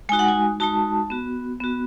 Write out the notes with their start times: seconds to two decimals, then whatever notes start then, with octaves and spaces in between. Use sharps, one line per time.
0.09 G#3 D#4 F#4 G#5
0.19 F#5
0.28 G#5
0.60 G#3 D#4 F#4 A5
1.10 B3 F#4
1.60 B3 F#4